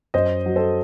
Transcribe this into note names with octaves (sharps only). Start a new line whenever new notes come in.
F#2 C5 D#5
F#3
A4 C5